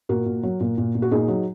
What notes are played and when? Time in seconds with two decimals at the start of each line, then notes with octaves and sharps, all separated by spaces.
0.09 A#2 F#4 A#4
0.26 A#2
0.43 F#3
0.60 A#2
0.78 A#2
0.95 A#2
1.02 F#4
1.11 A#2 D#4 G#4
1.28 F#3